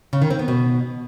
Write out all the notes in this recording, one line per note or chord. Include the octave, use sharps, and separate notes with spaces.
C#3
D#3
C4
B3
B2